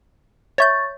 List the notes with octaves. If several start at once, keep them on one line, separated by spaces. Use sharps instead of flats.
C#5 E5 C#6 G6 A6